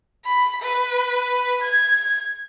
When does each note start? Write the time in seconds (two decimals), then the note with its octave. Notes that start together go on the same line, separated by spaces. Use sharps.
0.25 B5
0.62 B4
1.62 G#6